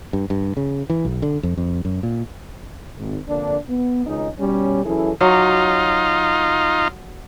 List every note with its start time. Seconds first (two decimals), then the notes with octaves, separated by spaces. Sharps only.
0.13 G2
0.30 G2
0.57 C#3
0.90 E3
1.05 B1
1.22 D3
1.43 F2
1.57 F2
1.85 F#2
2.03 A#2
2.99 G#1
3.28 F2 D3 A#3 D4
3.69 B3
4.06 G#1 C#2 C#4 D#4
4.39 B2 G3 C#4
4.84 E3 F#3 C#4 E4 G#4 A4
5.21 F#3 D#4 F4